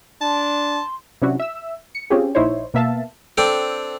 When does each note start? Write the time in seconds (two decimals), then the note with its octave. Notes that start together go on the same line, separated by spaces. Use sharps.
0.21 D4 A5 C6
1.22 C3 F#3 C#4 D4 E4 F#4
1.39 E5 E6
1.95 C#7
2.10 C4 C#4 F4 G4 G#4
2.35 A#1 D#4 E4 C5 C#5
2.74 B2 A#3 B3 E5 F5 A5
3.37 C4 D4 A4 G5